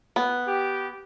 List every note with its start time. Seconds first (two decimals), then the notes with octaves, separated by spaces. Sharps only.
0.16 B3
0.48 G4